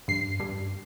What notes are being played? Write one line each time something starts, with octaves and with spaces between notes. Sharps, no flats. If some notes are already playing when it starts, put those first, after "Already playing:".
G2 C7
G2